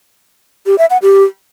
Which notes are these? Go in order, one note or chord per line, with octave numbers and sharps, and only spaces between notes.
G4
E5
F#5
G4